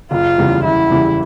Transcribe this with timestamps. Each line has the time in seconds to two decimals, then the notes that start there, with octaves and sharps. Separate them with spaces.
0.11 F#1 F4
0.38 E2 C#3 E3 G3
0.64 F#1 E4
0.91 E2 C#3 E3 G3